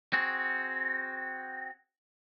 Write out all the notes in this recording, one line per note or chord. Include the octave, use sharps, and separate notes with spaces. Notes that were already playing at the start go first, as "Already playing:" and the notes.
C4 F#4 G#4